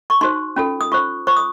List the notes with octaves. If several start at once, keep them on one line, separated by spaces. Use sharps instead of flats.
C#6
D#4 F#4 C5 C6
C#4 F4 A4
D#6
F4 C5 C#6
F4 C5 C#6
D#6